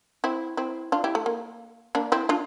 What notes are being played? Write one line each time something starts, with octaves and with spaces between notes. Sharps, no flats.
C4 E4
C4 E4
D4 F4
E4 G4
A3
A#3
A#3 D4
C4 E4
D4 F4